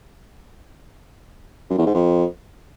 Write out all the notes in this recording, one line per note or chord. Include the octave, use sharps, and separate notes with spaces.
F#2
E2
G#2
F2